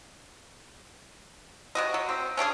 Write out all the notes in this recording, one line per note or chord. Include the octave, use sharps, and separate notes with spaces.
C3 F#4 D#5
F#3
C4
C#4 D4 F#4 G#4